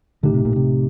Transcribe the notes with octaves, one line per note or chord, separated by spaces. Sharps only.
A#1 A2 D3 A3 D#4 G4
C3
A#2
C3